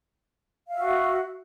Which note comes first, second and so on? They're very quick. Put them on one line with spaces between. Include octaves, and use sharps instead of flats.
F5 E5 F#4